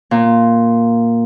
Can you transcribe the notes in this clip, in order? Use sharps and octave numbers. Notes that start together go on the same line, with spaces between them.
A#2